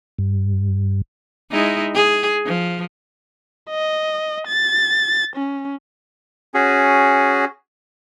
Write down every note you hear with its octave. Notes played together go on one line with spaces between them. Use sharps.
G2
G#3 D#4 E4
G#4
F3
D#5
A6
C#4
C#4 F#4 G#4